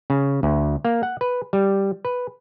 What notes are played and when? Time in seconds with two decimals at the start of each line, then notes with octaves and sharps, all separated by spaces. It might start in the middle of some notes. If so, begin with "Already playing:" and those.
0.10 C#3
0.43 D2
0.85 A#3
1.03 F#5
1.21 B4
1.53 G3
2.05 B4